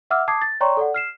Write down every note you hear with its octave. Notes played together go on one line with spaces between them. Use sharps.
E5 F#5 D6 E6 F6
A5 D6 D#6 G#6 C7
A6
C#5 D5 G5 A#5 C6 C#6
A4 D5 F#5
F6 C7 E7